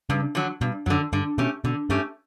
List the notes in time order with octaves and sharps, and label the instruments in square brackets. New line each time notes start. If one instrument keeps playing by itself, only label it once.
[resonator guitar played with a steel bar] G2 [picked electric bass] C#3
[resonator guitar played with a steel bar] D3 F#3
[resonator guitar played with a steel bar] G2 [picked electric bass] B2
[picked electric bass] F#2 [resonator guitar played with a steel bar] F#3
[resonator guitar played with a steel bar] D3
[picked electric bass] G2 [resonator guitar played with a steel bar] D3
[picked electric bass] B2 [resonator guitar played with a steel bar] A3 C#4 G4
[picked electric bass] B2 [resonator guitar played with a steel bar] D3
[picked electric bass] G2 [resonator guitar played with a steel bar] A3 C#4 G4